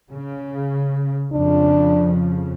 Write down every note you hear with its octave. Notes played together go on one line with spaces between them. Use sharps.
C#3
F2 C#3 F3 D4